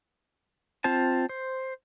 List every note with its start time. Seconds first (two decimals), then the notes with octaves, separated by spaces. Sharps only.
0.84 C4 F4 C5 A5
1.29 C5